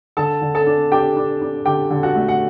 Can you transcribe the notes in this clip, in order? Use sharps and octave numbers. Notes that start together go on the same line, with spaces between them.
D3 A4 A5
D3
A4 A5
D4
D4 G4 G5
D4
D4
D3 G4 G5
D3
F#4 F#5
A3
F#5